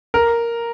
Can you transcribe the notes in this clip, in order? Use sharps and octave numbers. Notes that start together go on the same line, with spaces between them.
A#4